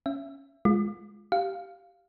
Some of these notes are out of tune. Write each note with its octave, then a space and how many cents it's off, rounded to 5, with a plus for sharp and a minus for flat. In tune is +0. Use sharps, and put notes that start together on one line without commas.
C#4 +0 E5 +20
G#3 +0 F4 +0
G4 -15 F5 +0